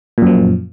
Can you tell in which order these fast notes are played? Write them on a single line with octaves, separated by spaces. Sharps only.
A#2 F#2 F3